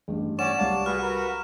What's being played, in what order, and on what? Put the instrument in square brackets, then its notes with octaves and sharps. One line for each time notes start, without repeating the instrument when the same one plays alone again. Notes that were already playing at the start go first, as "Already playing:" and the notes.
[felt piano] A1 G2
[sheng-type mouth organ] C#4 D5 [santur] F#5 [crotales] C#6 E7
[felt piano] C2 F5 [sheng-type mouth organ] D4 A5
[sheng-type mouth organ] F#4 G#4 B4 [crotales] F6
[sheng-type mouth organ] F#4 A#4 B4